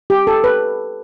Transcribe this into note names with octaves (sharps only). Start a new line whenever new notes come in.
G4
A4
B4